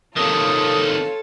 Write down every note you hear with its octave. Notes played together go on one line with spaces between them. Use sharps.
C3 D#3 F4 A4 C#5 A5 D#6